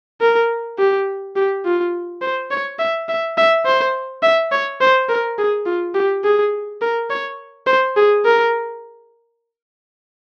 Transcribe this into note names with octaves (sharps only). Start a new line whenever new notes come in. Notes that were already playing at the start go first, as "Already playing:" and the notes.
A#4
G4
G4
F4
C5
C#5
E5
E5
E5
C5
E5
C#5
C5
A#4
G#4
F4
G4
G#4
A#4
C#5
C5
G#4
A#4